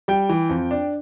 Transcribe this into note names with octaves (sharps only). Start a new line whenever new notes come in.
G3 G5
E3
F2
D4